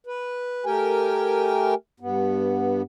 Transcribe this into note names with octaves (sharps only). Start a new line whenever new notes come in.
B4
A3 G4 A#4 G5 G#5
G2 B3